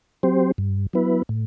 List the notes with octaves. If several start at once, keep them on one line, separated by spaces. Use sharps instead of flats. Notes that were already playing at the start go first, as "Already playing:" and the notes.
F#3 C4 G4 C5
G2
F#3 B3 E4 B4
A2